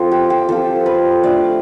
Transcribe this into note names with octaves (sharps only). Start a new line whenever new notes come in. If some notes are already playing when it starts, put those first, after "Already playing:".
Already playing: F3 C4 F4 A4
G4
G4
F3 C4 F4 A4
B4
A3 D4 F4 D5